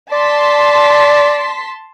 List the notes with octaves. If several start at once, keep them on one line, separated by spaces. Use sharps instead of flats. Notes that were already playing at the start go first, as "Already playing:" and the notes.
D5 A5 C6 B6